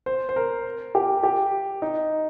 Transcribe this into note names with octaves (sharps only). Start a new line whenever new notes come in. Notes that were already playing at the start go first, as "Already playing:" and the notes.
C5
C5
A#4
G4
G4
D#4